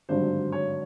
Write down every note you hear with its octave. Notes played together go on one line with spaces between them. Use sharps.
G#1 G2 D3 F#3 C5
C#5